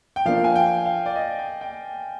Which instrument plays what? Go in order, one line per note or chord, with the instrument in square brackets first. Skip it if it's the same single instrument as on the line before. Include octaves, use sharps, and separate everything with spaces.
[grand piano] G5
[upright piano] F3 A#3 D4 [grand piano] F5
[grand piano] G#5
G5
F5
D5
D#5
G5
G5